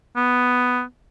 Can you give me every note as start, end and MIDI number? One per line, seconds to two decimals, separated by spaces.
0.16 0.82 59